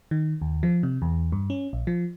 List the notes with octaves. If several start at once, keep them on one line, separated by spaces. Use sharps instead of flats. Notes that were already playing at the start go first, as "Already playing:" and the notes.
D#3
D#2
F3
C3
E2
G2
C#4
A#1
F3